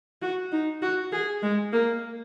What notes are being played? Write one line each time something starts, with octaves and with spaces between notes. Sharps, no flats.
F#4
D#4
F#4
G#4
G#3
A#3